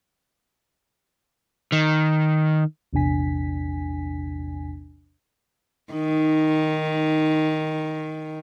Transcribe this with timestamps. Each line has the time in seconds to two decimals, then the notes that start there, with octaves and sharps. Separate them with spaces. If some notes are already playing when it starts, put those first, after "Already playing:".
1.72 D#3
2.93 A#1 E2 C3 D4 G#5 B6
5.93 D#3 D#4